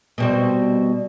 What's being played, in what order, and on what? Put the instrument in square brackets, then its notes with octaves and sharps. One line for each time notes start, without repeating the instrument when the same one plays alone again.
[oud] B2 G3 C4